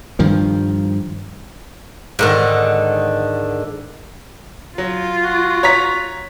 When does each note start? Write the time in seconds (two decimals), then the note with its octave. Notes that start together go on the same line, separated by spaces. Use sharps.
0.19 G2 D#3 F3
2.19 G#2 D3 D#3
4.78 F#3 F4
5.24 F#4
5.63 C#5 A#5 B6